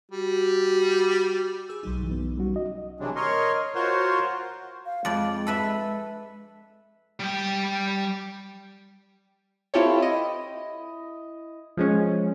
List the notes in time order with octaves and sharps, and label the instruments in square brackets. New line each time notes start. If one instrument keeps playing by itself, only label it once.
[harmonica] G3 [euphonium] F#4
[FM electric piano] G#4 E6
B1 F#3 D#4
[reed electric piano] G2 E3
B3
G3 C#4 F#4
D#5
[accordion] C3 E3 F#3 G#3 C4 D4
A#4 C#5 D#5 C6
F4 F#4 A#4 C5 C#5 C6
[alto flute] F5
[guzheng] F2 D5 [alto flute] G#3
[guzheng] A4 B4 E5
[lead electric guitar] G3 G5
[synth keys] C4 E4 F4 G4 A4 C#5
E4 D#5
F3 G#3 C#4